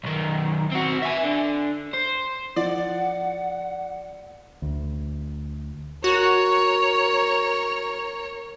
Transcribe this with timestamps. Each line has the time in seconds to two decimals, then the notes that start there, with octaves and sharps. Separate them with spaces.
0.04 B1 D#3
0.72 C4 F#4
1.03 E5 G#5
1.23 D3
1.93 C5
2.56 F3 D5 F#5
4.62 D2
6.04 F#4 A#4 C#5